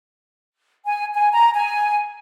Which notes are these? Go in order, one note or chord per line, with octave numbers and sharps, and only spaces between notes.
G#5
G#5
A#5
G#5